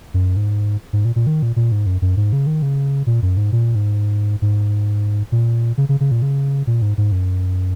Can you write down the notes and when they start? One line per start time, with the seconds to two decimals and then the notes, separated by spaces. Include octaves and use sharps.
0.14 F#2
0.36 G#2
0.93 G#2
1.05 A#2
1.16 A#2
1.27 D#3
1.43 A#2
1.56 A#2
1.72 G#2
1.86 F#2
2.02 F#2
2.17 G#2
2.33 C#3
2.47 D#3
2.62 C#3
3.07 A#2
3.22 F#2
3.37 G#2
3.52 A#2
3.75 G#2
4.42 G#2
5.32 A#2
5.78 C#3
5.89 C#3
6.01 C#3
6.11 A#2
6.22 C#3
6.67 A#2
6.82 G#2
6.98 G#2
7.12 F#2